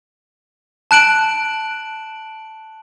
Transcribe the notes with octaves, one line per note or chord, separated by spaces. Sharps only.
A5 F#6 D7 F#7